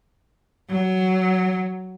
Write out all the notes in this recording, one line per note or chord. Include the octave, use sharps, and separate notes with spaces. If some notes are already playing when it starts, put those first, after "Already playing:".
F#3